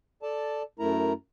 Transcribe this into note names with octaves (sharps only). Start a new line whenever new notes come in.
A4 D5 A5
F#2 A3 E4 A#4 A#5